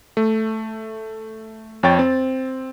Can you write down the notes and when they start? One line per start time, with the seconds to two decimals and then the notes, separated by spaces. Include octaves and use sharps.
0.17 A3
1.83 F2 C#5 G5 A6
1.99 C4